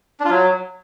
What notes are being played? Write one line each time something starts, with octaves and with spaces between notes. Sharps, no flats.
D4
F4
F#3